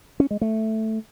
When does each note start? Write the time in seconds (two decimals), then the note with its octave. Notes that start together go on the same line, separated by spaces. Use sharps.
0.20 C#4
0.31 G#3
0.41 A3